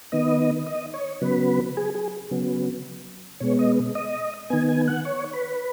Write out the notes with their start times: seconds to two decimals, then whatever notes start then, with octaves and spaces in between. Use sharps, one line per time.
0.12 D#3 B3 D#5
0.67 D#5
0.94 C#5
1.21 C#3 F#3 B3 B4
1.77 G#4
1.95 G#4
2.31 C#3 F#3 B3
3.40 B2 G#3 B3 C#5
3.59 D#5
3.95 D#5
4.50 D#3 B3 G#5
4.69 G#5
4.88 F#5
5.05 C#5
5.33 B4